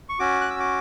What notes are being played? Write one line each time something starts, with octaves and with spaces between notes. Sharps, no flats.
C#6
C#4 F#4 D6
F#6
E6
D6